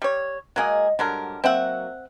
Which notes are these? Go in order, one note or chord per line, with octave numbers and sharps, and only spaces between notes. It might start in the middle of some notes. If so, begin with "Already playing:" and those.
G3 C#5
F#3 G#3 A#3 G#4 D#5 G5
G#2 D3 F#3 G3 G4 A#4
F#3 A#3 C4 E5 F#5